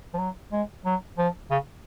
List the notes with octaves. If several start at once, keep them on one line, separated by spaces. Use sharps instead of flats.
F3
F#3
G#3
F#3
F3
C#3